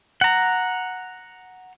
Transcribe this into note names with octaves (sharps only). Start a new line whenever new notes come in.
F#5 A#5